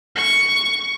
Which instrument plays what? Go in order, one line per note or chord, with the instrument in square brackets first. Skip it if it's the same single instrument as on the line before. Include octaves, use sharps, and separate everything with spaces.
[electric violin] C#6